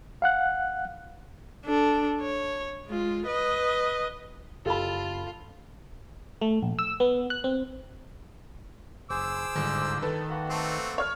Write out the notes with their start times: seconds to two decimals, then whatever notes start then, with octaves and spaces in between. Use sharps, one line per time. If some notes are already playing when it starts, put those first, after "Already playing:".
0.22 F5 F#5 F#6
1.65 D4 A4
2.21 C#5
2.86 G#3 F4
3.27 B4 D#5
4.66 F#1 F4 G4 A4 A5 B5
6.41 A3
6.63 A#1
6.79 E6
7.00 B3
7.30 F#6
7.44 C4
9.10 F#1 G#4 C5 D6 E6
9.56 G1 G#2
10.02 D#3 A4 B4
10.30 A#3 F#4 F#5
10.50 A3 C4
10.98 C#5 F6